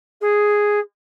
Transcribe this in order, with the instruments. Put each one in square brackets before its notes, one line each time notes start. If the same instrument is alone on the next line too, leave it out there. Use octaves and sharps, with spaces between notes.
[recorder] G#4